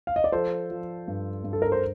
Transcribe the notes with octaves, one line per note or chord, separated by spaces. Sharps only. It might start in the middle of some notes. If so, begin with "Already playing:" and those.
F5
D#5
D5
F3 A4 C5
F3
G2
G2
A4
A#4
C5